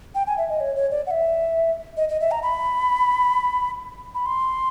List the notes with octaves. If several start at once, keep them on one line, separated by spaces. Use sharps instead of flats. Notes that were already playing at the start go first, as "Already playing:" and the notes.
G5
G#5
E5
D#5
C#5
C#5
D5
F#5
E5
D#5
D#5
E5
A#5
B5
B5
C6